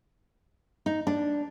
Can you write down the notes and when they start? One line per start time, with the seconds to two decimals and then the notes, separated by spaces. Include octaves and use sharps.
0.86 D#4
1.07 D4